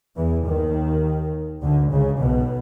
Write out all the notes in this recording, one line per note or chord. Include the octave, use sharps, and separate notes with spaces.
E2 E3
D#2 D#3
D2 D3
C#2 C#3
B1 B2